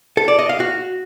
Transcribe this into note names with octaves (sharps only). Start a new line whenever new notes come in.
A4
D5
D#5
F5
F#4